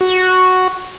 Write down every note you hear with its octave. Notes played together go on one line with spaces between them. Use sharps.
F#4